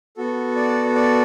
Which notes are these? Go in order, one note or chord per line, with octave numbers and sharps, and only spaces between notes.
B3 F#4 A4
D5
D5